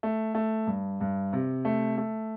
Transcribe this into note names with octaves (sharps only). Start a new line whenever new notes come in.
A3
A3
G2
G2
C3
A3
A3